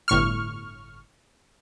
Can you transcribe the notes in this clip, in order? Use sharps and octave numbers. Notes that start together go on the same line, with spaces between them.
G1 A2 C#6 F6